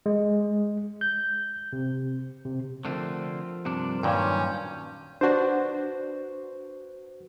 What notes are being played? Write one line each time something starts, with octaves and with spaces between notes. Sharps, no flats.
G#3
G6
C3
C3
D3 F3 A3 C4 F4 A#4
G2 C3 D4
G2 A#2 D#3 F#3 C#4 G6
D4 F#4 B4 C5